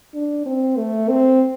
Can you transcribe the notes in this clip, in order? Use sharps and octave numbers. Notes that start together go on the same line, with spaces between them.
D4
C4
A3
C4